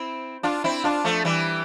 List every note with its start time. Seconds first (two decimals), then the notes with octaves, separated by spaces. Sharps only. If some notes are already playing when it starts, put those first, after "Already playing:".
Already playing: C4 E4
0.43 D4 F4
0.64 C4 E4
0.84 D4 F4
1.04 F3 A3
1.25 E3 G3